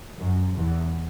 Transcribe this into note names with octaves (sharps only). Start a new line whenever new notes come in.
F#2
E2